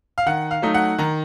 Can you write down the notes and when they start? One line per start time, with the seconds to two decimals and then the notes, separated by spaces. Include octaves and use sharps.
0.18 F5
0.26 D#3 F#5
0.51 F5
0.62 F#3 A3 D#4
0.74 F#5
0.98 D#3 A#5